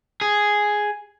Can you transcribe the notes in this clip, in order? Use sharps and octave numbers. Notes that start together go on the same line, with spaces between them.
G#4